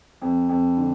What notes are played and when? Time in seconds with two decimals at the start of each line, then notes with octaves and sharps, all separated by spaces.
0.22 F2
0.49 F2
0.77 D3